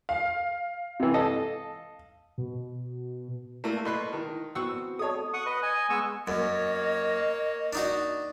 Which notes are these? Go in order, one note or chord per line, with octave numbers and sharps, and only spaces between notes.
F5
C3 E3
A4 D#5
B2
A3 A#3 E4
B2 B4 C6 F#6
D#3 E4
B3 C4 F#4 C#6 E6
A4 C#5 D#5 A5 D#6
F#5 C#6 D#6
B4 D#5
D#5 G#5
G#3 B3 G#5 C#6 E6
F#2 A#3 C#5 D#5
D4 D#4 F#4